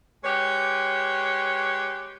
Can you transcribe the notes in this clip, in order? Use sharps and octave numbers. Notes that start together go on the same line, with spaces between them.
G#3 G4 B4 C#5